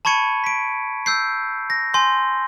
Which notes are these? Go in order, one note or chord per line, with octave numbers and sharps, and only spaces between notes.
A5 B5 C#6 G#6 C#7 D#7
B6 D7
E6 G6 C7
A#6
G#5 C6 G6